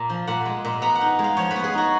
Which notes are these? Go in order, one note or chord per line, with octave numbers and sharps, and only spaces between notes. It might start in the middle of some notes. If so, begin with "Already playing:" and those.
Already playing: A#2 A#5
F3
A#2 F#5
G#3
A#2
B3 A#5
F#5
D#4
G#3
F5
F3 C#5
B4
B3
G#4
D#4 F#4